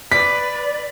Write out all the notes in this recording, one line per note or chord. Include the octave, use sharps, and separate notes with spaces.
B4 D5 D6 B6